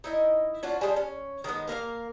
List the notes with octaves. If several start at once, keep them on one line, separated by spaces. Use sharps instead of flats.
D#4 E4 D#5
C#4 D4 F4 F#4
G3 G#3 D4
C#4
D#3 G#3 A#3 B3
A#3 A#4 B4 F5